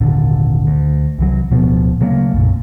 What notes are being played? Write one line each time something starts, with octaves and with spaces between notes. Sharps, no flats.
G#1 D#2 A#2 D3
D2
C2 E3 F#3
D1 B2 F3 B3
C#3 F#3 A3 A#3
B1 F#2 A#2